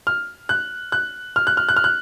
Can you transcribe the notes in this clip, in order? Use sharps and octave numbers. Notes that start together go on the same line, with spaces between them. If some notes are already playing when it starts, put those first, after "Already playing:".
F6
F#6
F#6
F6
F#6
F6
F#6
F6
F#6